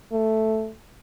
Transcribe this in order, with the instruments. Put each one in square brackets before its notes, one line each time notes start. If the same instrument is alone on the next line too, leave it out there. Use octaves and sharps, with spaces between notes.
[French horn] A3